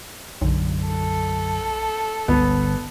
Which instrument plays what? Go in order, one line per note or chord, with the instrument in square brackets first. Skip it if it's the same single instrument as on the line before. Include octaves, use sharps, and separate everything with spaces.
[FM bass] B1 [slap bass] F#2 D3
[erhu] A4
[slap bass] G1 [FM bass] C#2 [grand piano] B3